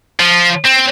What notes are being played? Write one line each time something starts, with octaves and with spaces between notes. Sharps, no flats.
F3
C4